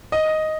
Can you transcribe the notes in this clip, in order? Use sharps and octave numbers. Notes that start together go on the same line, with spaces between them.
D#5